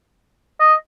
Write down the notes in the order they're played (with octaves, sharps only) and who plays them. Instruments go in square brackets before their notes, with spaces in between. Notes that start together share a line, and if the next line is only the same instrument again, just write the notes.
[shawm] D#5